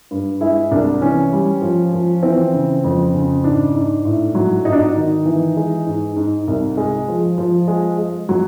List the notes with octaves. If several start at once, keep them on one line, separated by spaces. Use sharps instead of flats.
G2
G#3 E4
C2 D4
E3 C#4
G3
F3
F3
E3 C4
C#3
F2
C#3
G#2 D4
G#2
A2
F#3
G#2 D#4
D4
D#4
D#3
E3
G#3
G#2
G#2
C2
G#3
F3
F3
G#3
G#3
F#3 F#4